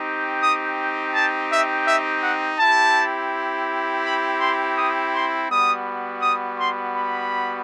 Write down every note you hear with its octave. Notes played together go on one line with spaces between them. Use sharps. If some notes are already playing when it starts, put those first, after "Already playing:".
Already playing: C4 D#4 G4
D#6
A5
E5
E5
F#5
C4 E4 G4 A5
B5
C6
D#6
C6
G3 B3 F#4 D#6
D#6
C6
B5